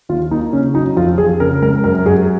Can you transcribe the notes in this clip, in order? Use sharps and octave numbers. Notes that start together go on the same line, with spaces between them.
D#2 F4
A#3 D#4
C#3 C#4
F#3 D#4
F2 F4
F2 G#4
C#3 A#4
G#3 A#4
F#2 A#4
F#2 G#4